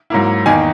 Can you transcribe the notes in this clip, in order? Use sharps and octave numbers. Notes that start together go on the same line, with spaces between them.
G#2 F#3 A#3 E4
E2 D#3 A#3 D#4 G#5